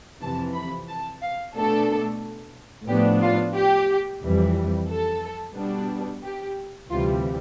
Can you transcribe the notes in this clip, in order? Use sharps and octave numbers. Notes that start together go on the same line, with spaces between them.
F2 C3 E3 A5
B5
A5
F5
B2 A3 D4 A4
A2 F3 B3 D4 G4
F4
G4
F2 E3 G3
A4
B2 G3 B3 D4
G4
D2 C3 E3 G3 F4